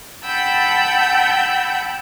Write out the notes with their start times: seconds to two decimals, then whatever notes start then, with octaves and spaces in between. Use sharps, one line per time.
0.24 F#5 G5 A5 B5 E6 G6